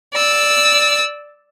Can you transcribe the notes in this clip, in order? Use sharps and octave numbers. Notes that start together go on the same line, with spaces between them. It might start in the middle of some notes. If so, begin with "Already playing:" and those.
D5 E6